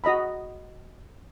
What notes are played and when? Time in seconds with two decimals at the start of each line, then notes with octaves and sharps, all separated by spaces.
0.04 F#4 D#5 A#5 B5